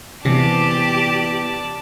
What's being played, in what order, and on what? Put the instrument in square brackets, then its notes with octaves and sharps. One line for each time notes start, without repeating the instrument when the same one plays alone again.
[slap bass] C3 [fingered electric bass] E3 B3 [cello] G4 [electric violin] D5 A5